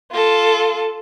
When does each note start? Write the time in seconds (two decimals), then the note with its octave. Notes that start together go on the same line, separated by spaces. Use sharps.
0.12 F4 A4